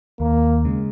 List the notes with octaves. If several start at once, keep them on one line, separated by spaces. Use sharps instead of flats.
D#2 A#3
C#3 G#3